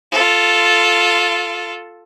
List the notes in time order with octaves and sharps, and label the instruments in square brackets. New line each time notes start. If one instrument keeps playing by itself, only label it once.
[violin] F4 A4